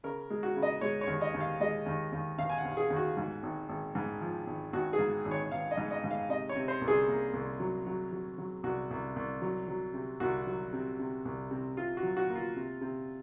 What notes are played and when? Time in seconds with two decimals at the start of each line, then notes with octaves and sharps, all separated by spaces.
0.04 C#3 A#4
0.30 G#3
0.43 F#4
0.56 C#3
0.62 D#5
0.81 G#3 C#5
1.01 C#5
1.07 D#2
1.21 D#5
1.34 D#2
1.40 F5
1.60 G#3 D#5
1.86 D#2
2.12 D#2
2.38 D#2 F5
2.50 G#5
2.58 F#5
2.65 D#2
2.77 G#4
2.90 D#2
2.96 F#4
3.17 G#2
3.43 G#1
3.69 G#1
3.95 G#2
4.21 F3
4.47 G#1
4.73 G#1 F#4
4.93 G#4
4.99 G#2
5.25 G#1
5.31 C#5
5.51 G#1 F5
5.71 D#5
5.77 G#2
5.91 D#5
6.04 G#2
6.10 F5
6.29 C3 D#5
6.49 C#5
6.56 C3
6.68 C5
6.81 C2
6.88 G#4
7.08 A#3
7.33 C2
7.60 F#3
7.86 F#3
8.12 F#3
8.38 F#3
8.63 C2 F#4
8.91 C2
9.16 C2
9.42 F#3
9.68 F#3
9.94 C3
10.20 C2 F#4
10.47 F#3
10.73 C3
10.99 C3
11.25 C2
11.51 C3
11.77 C3 F4
11.97 F#4
12.03 F#3
12.17 F#4
12.30 A#3
12.35 F4
12.56 C3
12.81 C3